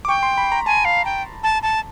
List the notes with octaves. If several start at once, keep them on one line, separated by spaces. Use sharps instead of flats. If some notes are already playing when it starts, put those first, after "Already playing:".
D6
G5 C#6
C6
B5
A#5
G#5 A5
F5
G5
A5
A5